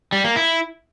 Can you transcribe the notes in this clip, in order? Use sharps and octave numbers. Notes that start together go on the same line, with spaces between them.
G3
A#3
E4